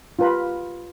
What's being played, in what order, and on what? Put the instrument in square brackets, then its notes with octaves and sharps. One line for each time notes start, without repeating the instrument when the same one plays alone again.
[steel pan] F4 G4 B4 A#5 B5